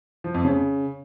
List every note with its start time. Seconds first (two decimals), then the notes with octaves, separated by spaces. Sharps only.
0.24 F3
0.34 F2
0.45 C#3